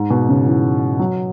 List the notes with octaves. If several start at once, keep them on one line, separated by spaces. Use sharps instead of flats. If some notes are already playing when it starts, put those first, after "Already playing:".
Already playing: G#2
B2
C#3
E3
F#3